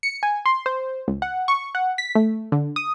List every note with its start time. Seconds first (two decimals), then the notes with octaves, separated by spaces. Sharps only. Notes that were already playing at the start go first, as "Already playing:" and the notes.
0.03 C#7
0.23 G#5
0.46 C6
0.66 C5
1.08 C#2
1.22 F#5
1.48 C#6
1.75 F#5
1.98 B6
2.15 A3
2.52 D3
2.76 D#6